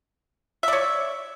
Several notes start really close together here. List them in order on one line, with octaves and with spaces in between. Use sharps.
E5 D5 C#5